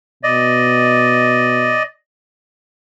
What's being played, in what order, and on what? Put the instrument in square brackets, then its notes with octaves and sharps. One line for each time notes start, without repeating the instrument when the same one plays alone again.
[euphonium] B2 [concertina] D5 D#5